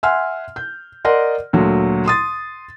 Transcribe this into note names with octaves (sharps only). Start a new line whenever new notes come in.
E5 F#5 G#5 C6 F6
G6
A#4 D5 D#5 F#5 C6
D2 A#2 F#3
C6 D#6 A6